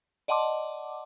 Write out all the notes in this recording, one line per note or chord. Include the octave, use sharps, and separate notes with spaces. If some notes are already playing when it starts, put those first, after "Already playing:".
D5 D#5 F#5 A5 C6 D6